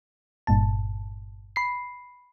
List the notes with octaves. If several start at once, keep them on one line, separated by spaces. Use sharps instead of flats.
G1 G2 A#2 A5
B5 C7